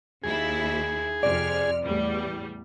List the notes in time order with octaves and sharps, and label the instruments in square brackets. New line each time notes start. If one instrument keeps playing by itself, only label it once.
[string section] D#2 E4 [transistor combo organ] G#4
[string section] F2 C3 F6 [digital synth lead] D5
[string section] E2 A2 G3